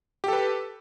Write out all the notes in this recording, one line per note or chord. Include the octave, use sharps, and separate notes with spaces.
G4 A4 B4